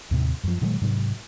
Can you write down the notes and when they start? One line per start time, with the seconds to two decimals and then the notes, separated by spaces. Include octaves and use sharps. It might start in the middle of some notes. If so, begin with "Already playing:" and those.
0.11 D#2 A2 C3
0.44 F#2 F3
0.61 A#2 D#3 F#3 G#3
0.82 G#2 C3 F#3 D4